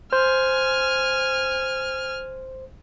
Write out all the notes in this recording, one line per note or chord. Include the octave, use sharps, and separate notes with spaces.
C5 G#5 F6